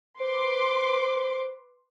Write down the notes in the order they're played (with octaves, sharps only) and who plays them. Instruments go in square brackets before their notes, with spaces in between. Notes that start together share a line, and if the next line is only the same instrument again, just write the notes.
[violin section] B4 C6 D6 [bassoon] C5